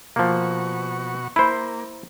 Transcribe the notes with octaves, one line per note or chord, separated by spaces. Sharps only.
B2 F3 A#3 F#4 C#6
A#3 E4 C5 B5